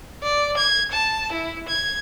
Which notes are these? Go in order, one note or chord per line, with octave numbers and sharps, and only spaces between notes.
D5
G#6
A5
E4
G#6